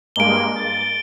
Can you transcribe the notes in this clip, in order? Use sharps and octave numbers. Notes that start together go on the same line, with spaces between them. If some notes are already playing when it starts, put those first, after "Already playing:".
G2 G#3 A#3 D7 G7
A6